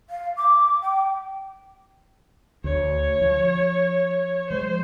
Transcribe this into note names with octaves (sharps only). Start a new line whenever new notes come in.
F5
D6
G5
D2 C#5
F3
F3 G#3 C5